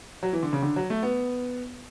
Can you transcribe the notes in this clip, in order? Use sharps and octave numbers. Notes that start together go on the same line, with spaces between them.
F#3
E3
D3
C#3
D3
F#3
A3
B3